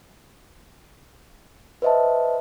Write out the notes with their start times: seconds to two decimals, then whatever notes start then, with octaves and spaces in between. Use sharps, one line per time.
1.82 B4 C5 D#5 E5 A5